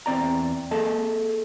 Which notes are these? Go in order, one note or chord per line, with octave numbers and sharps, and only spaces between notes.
E2 C4 D5 A#5
A#3 G#4 A4 D#5 A5